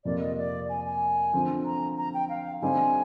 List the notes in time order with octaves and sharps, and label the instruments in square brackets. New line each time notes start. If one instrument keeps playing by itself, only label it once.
[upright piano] F2 C3 F3 A#3 F4 [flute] D5
[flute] D#5
D5
G#5
G#5
[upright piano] D3 F3 C4
[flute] A#5
A#5
G5
F5
[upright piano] D3 G3 C4 D#4 G4 [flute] G#5